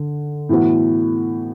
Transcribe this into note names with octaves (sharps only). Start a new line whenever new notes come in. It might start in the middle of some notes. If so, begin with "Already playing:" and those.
Already playing: D3
A2 E3 B3 F#4